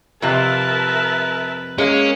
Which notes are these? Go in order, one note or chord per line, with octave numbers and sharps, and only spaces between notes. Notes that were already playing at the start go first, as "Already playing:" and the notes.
F2 C3 A#4 B4 E5 A5
G#3 A#3 C#4